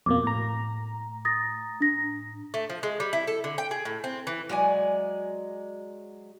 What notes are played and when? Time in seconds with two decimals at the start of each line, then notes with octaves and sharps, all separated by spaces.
0.06 F2 B2 A#3 D6
0.23 A2 A#5
1.25 D#6 A6 A#6
1.80 D4 A#6
2.54 A3
2.69 F3
2.83 G#3
3.00 G3
3.13 E4
3.27 A4
3.44 D3
3.58 G5
3.71 G#4
3.85 A2
4.04 C4
4.27 E3
4.49 F#3 G#3 D5 G#5